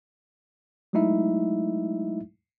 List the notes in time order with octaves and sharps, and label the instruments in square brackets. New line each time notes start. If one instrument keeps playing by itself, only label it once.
[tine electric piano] F#3 G#3 A3 D#4 E4 E5